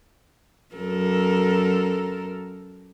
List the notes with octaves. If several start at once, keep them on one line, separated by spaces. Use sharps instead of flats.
F#2 A4 A#4